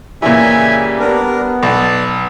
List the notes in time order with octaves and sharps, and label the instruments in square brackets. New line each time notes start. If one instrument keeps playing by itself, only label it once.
[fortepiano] A#2 E3 [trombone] C#3 [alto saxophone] G3 [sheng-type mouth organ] E5 G#5
[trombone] B3 [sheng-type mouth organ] D4 A#4
[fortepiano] B1 [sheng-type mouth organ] D5 A5